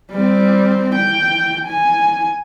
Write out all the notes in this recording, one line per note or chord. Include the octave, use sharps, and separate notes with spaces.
G3 C4
G5
G#5